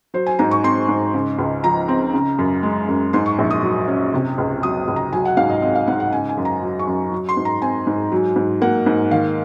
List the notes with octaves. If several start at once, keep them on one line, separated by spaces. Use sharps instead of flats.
F#3 C5
G#5
G#2 A#5
C#6
C4 C6
G#2
C#3
C#2
F3 A#5
C4
C#3
F#2
G#3
F#2
G#2 C6
C#6
A#1
D#6
F#3
C#4
C3
C#2
F#3 D#6
C#2
A#5
F#3 G#5
F#5
G#2 F5
D#5
C4 D#5
F5
G#2 F#5
F#5
C#3 G#5
G#5
F#2
A#5
F#3
C#6
F#2
F#3
C6
G#2
A#5
C4 G#5
G#2
F#3
G#2
A#3 F#5
G#2
D#3 F5